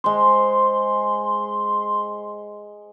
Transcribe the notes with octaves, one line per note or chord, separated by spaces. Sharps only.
G#3 C5 C6